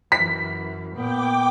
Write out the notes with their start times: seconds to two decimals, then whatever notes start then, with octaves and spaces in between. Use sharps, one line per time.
0.12 F#2 E3 B6
0.95 A#2 B3 G5 D6